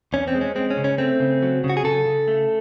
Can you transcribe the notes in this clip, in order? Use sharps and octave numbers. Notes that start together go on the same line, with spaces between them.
E2 C#4
C4
G#3
C#4
G#3 C4
C#4
C#3
C#4
A3 C4
C#3
F#3
C#3
F#4
G#4
C#3 A4
C#3
A3